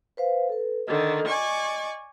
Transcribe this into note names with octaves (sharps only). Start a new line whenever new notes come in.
B4 C5 F5
A4 B4
D3 D#3 D#5
D5 G#5 C#6